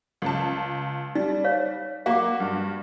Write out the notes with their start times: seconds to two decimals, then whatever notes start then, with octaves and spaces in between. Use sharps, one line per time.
0.22 C#2 A5
1.15 G3 D#4
1.44 C5 C#5 F5
2.06 A#3 F#4 F5 F#5 D6
2.40 G2